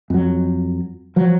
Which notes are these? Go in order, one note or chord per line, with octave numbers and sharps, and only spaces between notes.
F2 F#3
F3 F#3